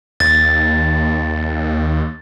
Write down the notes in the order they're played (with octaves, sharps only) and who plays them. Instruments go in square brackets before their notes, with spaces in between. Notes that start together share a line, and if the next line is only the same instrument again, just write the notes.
[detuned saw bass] D#2 [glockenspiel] A6